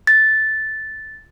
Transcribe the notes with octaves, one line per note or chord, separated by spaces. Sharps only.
A6